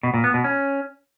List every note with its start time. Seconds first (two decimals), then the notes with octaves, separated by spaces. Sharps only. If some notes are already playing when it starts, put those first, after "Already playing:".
0.03 B2
0.14 A#2
0.24 B3
0.34 B2
0.44 C#4